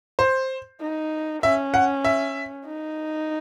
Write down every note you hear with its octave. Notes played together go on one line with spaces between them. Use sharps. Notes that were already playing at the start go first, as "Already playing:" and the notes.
C5
D#4
C#4 E5
F#5
E5
D#4